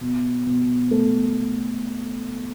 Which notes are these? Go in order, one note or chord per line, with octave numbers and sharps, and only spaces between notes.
B2
B2
A3